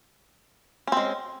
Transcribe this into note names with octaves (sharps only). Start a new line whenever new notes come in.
G#3 C4 C#4